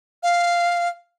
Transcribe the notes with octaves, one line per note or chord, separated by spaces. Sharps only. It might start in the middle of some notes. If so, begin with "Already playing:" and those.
F5